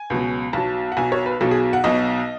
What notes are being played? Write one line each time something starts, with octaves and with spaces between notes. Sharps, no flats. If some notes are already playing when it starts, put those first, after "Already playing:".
Already playing: G#5
C#2 B2 F#3
B1 B2 F#3 A5
F#5
B1 B2 F#3 G#5
C#5
B4
B1 B2 F#3 A4
G#4
F#5
B1 B2 F#3 D#5